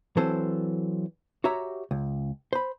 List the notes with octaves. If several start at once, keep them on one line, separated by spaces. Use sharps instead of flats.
E3 F#3 C4 A4 C5
F#4 G4 C#5 E5 A#5
C#2
C5 B5